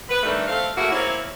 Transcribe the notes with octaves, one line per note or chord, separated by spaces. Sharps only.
B4
D#3 E3 G3 A3 D4
A3 C4 F5
A3 A#3 E4 F#4 G#4
A#3 C4 C#4 E4